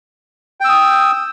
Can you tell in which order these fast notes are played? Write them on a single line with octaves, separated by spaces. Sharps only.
G5 E6 D#6